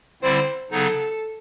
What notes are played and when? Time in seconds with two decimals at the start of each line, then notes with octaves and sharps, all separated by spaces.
0.22 D3 G3 C4 E4 C5
0.71 C#3 F#3 B3 D#4 A4